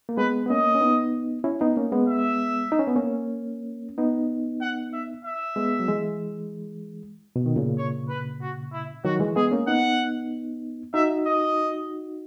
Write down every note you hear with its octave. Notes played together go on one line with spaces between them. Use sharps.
A#3
G#3 B3 B4
B3
A#3 C#4 D#5
C#4
B3 D#4
C#4 E4
B3 D#4
A#3 C#4
G#3 B3
E5
D#4
C#4
B3
A#3 C#4
B3 D#4
F#5
E5
E5
G#3 B3
F#3
E3 G#3
B2
D#3
A#2 C#3
C#5
B4
F#4
E4
D#3 F#3 F#4
E3 G#3
G#3 B3 G#4
A#3 C#4
B3 D#4 F#5
D#4 F#4 E5
D#5